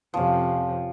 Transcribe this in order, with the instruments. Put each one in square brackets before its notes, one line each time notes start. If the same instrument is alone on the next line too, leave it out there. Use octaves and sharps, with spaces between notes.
[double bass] F2 C3 [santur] F3 C#4